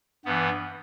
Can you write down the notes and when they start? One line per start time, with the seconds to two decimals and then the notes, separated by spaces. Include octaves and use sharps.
0.25 G2 E3 B3